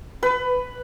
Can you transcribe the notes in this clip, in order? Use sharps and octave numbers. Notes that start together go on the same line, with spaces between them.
B4